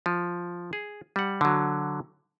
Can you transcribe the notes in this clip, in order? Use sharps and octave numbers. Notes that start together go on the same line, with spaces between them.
F3
G#4
G3 F#5
D3 F#3